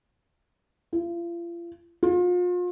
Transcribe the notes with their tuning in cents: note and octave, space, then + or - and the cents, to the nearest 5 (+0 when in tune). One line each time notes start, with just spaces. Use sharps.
F4 -40
F4 +35